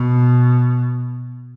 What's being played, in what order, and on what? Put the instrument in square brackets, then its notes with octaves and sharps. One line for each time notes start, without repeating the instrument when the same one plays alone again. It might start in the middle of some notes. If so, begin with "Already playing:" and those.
Already playing: [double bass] B2